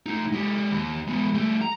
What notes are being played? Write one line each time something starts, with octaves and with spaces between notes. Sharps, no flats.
A3 D#4
G#3 G4
D#2
G#3 B3
G3 A3
A#5